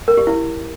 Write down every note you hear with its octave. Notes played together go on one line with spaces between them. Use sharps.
A#4
G4
E4